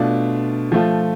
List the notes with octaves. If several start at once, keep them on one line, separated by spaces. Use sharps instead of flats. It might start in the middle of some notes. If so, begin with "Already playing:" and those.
Already playing: B2 A3 D4 F4
F3 A3 F4